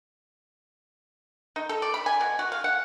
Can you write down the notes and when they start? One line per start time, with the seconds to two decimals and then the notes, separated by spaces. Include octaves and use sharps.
1.56 D#4
1.69 A4
1.82 D5
1.94 B5
2.06 G#5
2.21 B2
2.39 F#4
2.52 F5
2.64 F#5